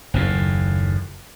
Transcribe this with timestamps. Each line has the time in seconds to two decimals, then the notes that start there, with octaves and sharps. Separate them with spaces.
0.14 F#1 D#2 A2